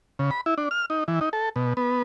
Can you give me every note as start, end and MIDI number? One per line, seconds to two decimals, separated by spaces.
0.19 0.30 49
0.31 0.41 83
0.46 0.54 64
0.58 0.69 62
0.71 0.86 89
0.90 1.04 63
1.08 1.20 52
1.21 1.29 63
1.33 1.49 69
1.56 1.73 47
1.77 2.02 59